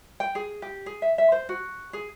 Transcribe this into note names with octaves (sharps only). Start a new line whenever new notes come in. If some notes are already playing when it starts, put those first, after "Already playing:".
G5
G#4
G4
G#4
E5
E5
C5
F#4
G#4